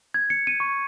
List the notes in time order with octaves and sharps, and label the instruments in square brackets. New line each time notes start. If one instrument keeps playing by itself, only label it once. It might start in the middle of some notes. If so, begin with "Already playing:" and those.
[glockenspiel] G#6
C#7
D#7
C#6